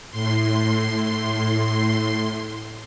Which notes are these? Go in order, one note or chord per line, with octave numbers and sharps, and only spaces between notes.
A2 C6